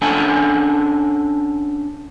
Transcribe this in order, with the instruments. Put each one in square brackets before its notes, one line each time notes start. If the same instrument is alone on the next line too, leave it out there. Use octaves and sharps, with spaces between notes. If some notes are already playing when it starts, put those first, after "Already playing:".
[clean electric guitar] C#4 D4 A4 F#5 G#5 A5